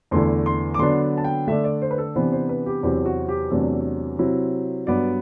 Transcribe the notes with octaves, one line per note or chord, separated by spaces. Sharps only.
E2 D3 A3 E4 C6
C6
D6
D3 F#3 B3 D4 C6
A5
G5
D3 A3 D4 E5
D5
C5
B4
A4
C3 E3 B3 D4 C5
C5
B4
G4
E2 C3 F#3 C4 E4 G4
F#4
G4
E2 C3 F#3 A3 D4 A4
C3 F#3 C4 E4
G2 F#3 B3 D5